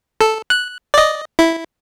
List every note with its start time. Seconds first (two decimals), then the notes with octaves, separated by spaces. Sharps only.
0.21 A4
0.50 F#6
0.94 D5 D#5
1.39 E4